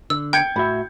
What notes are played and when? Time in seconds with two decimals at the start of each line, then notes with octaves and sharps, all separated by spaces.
0.10 D3 E6
0.33 G5 G6 G#6 C#7
0.56 A2 F#4 E5 B5